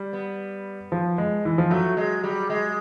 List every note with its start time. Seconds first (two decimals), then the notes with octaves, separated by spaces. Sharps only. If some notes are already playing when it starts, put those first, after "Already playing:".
Already playing: G3
0.13 B3
0.92 F3
1.18 G#3
1.45 E3
1.58 F3
1.70 F#3 A3
1.97 G#3
2.24 G3
2.50 G#3